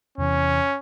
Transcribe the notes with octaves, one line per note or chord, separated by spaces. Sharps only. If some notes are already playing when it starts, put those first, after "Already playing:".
E2 C3 E3 C#4